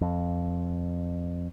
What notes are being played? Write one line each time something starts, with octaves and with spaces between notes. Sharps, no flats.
F2